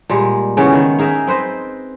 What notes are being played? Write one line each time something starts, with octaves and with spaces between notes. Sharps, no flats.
A#2 G3 G#3 F#5
C#3 E3 B3 C#4
D#3
D#4 G#4 A#4 E5
C4 B4 C5 D#5